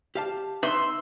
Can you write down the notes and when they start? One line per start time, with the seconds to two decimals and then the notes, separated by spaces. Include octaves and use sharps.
0.15 G4 F5 A5
0.63 D#4 B4 E5 C6 E6